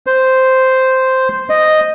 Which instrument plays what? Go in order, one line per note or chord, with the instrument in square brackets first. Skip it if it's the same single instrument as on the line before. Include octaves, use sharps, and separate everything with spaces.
[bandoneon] C5
D#5